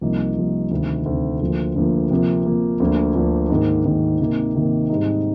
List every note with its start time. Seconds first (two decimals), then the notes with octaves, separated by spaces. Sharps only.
0.01 C2 C3 F3 A#3 D#4
0.36 C2 C3 F3 A#3 D#4
0.71 D2 C3 D#3
1.06 D2 C3 D#3
1.41 D2 D3 F3 A#3
1.76 D2 D3 F3 A#3
2.11 C3 F3 A#3
2.46 C3 F3 A#3
2.80 D2 D3 F3 A#3 D4
3.15 D2 D3 F3 A#3 D4
3.50 G#2 D#3 A#3
3.85 G#2 D#3 A#3
4.20 C3 D#3 A#3
4.55 C3 D#3 A#3
4.90 G#2 G3 C4 D#4